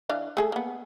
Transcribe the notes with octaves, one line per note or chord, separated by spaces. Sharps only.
E3 D4 F5
A3 G#4 A4
A#3 B3